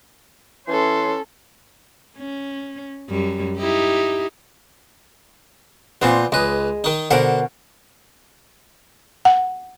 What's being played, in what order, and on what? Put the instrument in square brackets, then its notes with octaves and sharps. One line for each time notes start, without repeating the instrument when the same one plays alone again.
[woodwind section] E3 C#5 C6 [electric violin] C#4 A4
[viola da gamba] C#4
F#2 G3
D#4 E4 G4
[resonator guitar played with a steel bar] A#2 C4 C5 [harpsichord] B3 F4
[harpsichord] C#2 B4 [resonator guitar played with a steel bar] G#3
[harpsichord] D#3 D#4
[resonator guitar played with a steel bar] B2 A#4 F#5 [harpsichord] D3 C5
[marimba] F#5